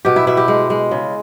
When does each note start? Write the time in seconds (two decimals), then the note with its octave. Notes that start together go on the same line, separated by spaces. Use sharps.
0.05 B2 G4
0.16 E4
0.27 B2 E4
0.37 G4
0.48 G#3
0.70 G#3
0.91 C#3